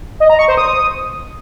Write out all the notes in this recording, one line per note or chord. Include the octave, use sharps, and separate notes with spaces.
D#5
A#5
C#6
C5
D#6